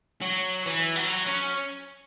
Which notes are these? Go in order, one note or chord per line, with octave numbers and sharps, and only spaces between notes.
F#3
E3
F#3
C#4